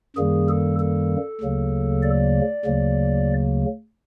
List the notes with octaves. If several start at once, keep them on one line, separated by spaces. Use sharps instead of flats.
F#2 D#3 G3 A#3 G#4
A4
A4
D2 C#3 F#3 A#3
D5
D2 C#3 F#3 A#3